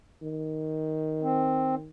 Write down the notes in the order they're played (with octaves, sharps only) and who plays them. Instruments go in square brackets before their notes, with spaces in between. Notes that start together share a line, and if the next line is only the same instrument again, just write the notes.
[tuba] D#3
[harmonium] C4